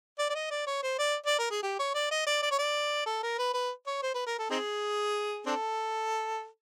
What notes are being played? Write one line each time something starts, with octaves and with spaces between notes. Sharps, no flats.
D5
D5
D#5
D5
C#5
C5
D5
D5
A#4
G#4
G4
C#5
D5
D#5
D5
D5
C#5
D5
A4
A#4
B4
B4
C#5
C5
B4
A#4
A4
C4 D#4 G#4
C4 D4 A4